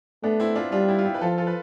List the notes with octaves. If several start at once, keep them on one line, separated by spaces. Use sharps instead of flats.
A3 B3 D4
C4 E4
D4 F4
G3 D4 F4
E4 G4
F4
E4 G4
B4
F3 F4 A4
F4 A4
B4